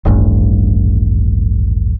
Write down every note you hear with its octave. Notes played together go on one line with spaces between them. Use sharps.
D#1 A1 G2